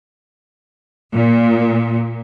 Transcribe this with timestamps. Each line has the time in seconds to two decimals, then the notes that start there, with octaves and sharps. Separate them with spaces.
1.12 A#2